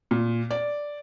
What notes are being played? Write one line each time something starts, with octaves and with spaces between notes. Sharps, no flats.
A#2
D5